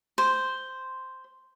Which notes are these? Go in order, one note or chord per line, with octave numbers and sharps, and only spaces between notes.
C5